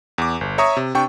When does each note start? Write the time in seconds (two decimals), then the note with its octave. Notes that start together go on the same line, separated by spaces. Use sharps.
0.18 E2 D6
0.41 G1
0.58 C#5 E5 A#5 C#6 D#6
0.77 C3
0.95 C3 D4 G5 C#6